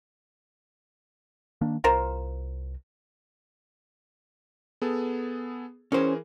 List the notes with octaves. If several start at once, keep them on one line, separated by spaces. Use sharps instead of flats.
D#3 A#3 D4
C2 F4 A#4 C5
B3 G#4 A4
E3 C#4 G#4 A#4 C5